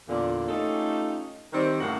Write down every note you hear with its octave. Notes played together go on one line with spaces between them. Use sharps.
E2 A#2 D3
A3 C#4 D#4 F4 G4 A4
D#3 G3 C4
F#2 A2 C#3 A#3 F#4